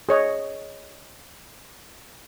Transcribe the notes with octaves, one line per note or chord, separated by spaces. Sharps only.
G#4 C#5 D#5